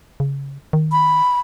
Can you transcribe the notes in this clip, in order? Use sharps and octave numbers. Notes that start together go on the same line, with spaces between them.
C#3
D#3
B5